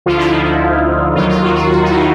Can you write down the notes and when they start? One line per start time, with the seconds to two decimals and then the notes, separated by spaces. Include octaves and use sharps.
0.06 D2 D3 F3 F4
0.18 E4
0.30 D#4
0.43 E4
1.15 D#2 D#3 F#3 F4
1.29 F4
1.43 F#4
1.56 F#4
1.70 F#4
1.83 D#4
1.90 E4
1.97 F4